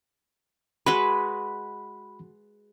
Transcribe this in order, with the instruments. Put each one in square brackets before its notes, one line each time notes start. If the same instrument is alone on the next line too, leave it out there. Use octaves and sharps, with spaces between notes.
[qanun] G#3 F#4 B4 [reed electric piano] B5